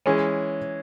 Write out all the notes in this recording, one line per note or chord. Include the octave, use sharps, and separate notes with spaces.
E3 G#3 C#4